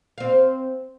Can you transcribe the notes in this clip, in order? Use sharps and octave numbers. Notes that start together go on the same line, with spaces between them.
C4 F5